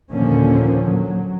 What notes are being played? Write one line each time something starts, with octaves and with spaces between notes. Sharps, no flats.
D#2 A#2 D3 F3 A#3 C#4
F#3